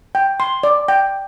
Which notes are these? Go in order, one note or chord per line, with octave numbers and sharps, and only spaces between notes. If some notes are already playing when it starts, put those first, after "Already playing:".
G5
C6
D5
G5